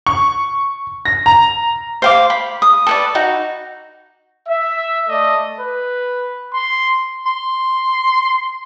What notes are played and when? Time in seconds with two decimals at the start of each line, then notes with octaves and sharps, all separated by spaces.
0.07 C#6
1.05 A#6
1.26 A#5
2.02 C5 F5 D6
2.30 B5
2.62 D#6
2.87 A4 B4 D5
3.15 D#4 F#4
4.48 E5
5.08 A3 A4 D5 D#5
5.60 B4
6.53 C6
7.26 C6